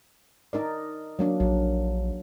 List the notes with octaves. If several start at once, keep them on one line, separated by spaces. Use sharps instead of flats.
D#4 A#4 D5
F#3 A#3 D4
A#1 F#3